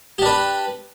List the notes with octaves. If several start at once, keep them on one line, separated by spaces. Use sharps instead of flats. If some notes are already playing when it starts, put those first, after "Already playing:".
D4 G4 B4